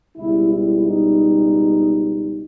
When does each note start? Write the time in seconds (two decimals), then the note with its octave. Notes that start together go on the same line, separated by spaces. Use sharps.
0.17 C#2 B2 G3 E4
0.53 E4
0.88 D#4